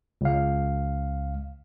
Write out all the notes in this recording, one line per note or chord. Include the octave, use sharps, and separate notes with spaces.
C#2 F5